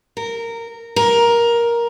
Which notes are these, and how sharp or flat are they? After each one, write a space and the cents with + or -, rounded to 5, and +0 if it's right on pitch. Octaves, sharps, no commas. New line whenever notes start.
A#4 -15
A#4 +10